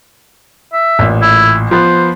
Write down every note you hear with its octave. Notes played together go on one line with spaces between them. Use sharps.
E5
A1 A#2
E4
F3 B3 B4 C5